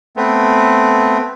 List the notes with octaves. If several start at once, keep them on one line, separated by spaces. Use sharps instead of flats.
A3 B3 C4